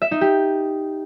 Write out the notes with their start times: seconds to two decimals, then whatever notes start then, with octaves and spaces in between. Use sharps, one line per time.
0.02 E5
0.11 D#4
0.21 G4